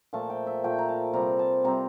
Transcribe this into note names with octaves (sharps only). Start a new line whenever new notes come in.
A#2 F3 A3 A5
G5
E5
A#2 F3 A3 G5
A#5
A5
C3 G3 C4 A#5
A5
C3 G3 C4 A#5